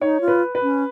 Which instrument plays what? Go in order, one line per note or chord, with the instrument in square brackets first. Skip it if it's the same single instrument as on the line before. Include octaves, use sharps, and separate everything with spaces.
[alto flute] D#4 [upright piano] C#5
[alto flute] F4
[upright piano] B4
B4
[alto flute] C#4